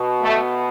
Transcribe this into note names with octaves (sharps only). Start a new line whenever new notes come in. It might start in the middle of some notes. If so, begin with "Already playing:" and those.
Already playing: B2
A3